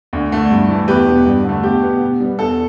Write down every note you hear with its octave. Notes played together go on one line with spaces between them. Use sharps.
D2
D3 A3
G2
E3 A3
E2 G4 B4
B2 B3
G2
D3 A3
B2 G4
B3
B2
G3 B3
E2 A4